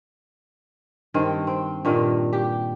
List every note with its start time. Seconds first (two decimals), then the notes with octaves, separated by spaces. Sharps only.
1.14 G2 D#3 C4
1.47 C4
1.85 G2 A#2 D#3
2.33 G4